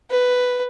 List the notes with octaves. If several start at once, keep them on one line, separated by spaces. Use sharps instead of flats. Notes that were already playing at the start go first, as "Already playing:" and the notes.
B4